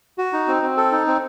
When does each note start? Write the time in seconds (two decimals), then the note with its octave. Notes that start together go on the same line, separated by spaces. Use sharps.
0.18 F#4
0.33 D#4
0.48 C4
0.62 C4
0.77 A4
0.92 D#4
1.07 C4